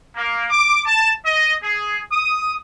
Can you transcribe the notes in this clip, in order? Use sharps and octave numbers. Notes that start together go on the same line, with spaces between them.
A#3
D6
A5
D#5
G#4
D#6